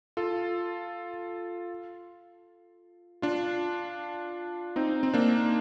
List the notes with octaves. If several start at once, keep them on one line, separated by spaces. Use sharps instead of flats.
F4 A4
D4 F4
C4 D#4
C4
A#3 D4